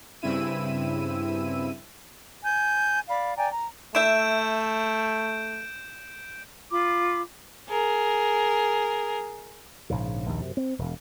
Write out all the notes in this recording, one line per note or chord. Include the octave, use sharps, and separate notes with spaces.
G2 C#3 C4 E4 E6 D#7
G#5 G6
D5 F5 B5
D5 G5 G#5 A#5
A#5
A3 E4 E5 G6 D7 E7
F4 B5 D6
G#4 A#4
A#1 G#2 C#3
A#1 D#2
F#2 C3
C4
E1